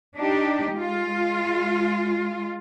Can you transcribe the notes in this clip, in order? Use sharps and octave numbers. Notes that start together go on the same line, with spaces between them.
D4 D#4 G4
G#3 F4